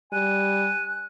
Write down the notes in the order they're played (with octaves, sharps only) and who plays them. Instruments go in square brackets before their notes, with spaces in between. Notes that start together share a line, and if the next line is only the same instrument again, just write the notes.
[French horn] G3 [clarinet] G#5 [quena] F#6